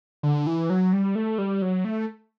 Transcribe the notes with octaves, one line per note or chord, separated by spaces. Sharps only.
D3
E3
F#3
G3
A3
G3
F#3
A3